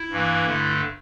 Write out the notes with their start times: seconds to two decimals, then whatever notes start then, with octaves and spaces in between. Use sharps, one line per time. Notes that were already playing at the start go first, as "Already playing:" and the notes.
Already playing: E4
0.10 G2 E3 A#3
0.47 G2 D3 A3